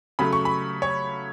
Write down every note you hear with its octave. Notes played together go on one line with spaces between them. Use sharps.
C#3 F#3 A3 B5
C#6
B5
C#5